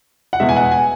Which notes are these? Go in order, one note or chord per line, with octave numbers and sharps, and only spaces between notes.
F#5
E2 B2 G#3 E5
G#5
F#5
G#5